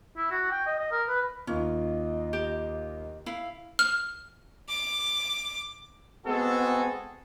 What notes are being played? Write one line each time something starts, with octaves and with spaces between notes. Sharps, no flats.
E4
F#4
G5
D#5
D#5
A#4
B4
D#2 C#4 F4 D#5
G4
E4 F5
F6
D6
G#3 B3 C4 F#4 G#4 A4